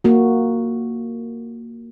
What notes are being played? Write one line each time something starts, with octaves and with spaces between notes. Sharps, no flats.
A#3 F#4